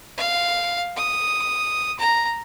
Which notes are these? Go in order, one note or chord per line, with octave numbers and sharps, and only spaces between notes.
F5
D#6
A#5